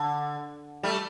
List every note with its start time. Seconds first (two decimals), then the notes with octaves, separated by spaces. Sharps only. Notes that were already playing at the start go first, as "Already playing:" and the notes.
Already playing: D3
0.83 G3 A3